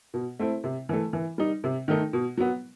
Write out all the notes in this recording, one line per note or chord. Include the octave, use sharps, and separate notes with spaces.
B2
A3 C4 E4
C3
E3 A3
E3
G3 D#4
C3
D#3 A3 D#4
B2
F#3 B3